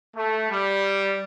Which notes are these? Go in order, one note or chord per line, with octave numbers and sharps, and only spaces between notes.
A3
G3